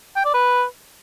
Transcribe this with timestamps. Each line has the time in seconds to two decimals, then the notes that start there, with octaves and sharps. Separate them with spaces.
0.16 G5
0.25 D5
0.34 B4